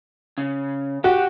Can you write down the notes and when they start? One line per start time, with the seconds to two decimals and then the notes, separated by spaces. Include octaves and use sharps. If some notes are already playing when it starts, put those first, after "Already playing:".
0.38 C#3
1.04 F#4 G4